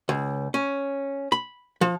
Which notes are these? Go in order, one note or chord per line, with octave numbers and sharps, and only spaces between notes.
C#2
C#4
B5
F3